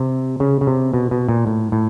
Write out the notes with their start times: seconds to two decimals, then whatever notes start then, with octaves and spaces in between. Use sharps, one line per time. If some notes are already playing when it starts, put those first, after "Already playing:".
Already playing: C3
0.40 C#3
0.61 C#3
0.67 C3
0.94 B2
1.11 B2
1.29 A#2
1.47 A2
1.72 A2